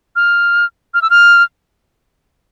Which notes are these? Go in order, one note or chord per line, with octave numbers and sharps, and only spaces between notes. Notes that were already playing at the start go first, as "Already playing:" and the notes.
F6
F6
E6
F6